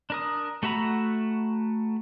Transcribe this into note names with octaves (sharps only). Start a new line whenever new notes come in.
D4 A#4 D#6
A3 F#4 E5 A#5 B5